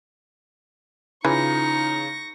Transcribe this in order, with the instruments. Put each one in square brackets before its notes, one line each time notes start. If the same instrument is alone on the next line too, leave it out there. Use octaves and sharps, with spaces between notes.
[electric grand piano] C#3 F4 [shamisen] E3 [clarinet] D#4 [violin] C#6 A#6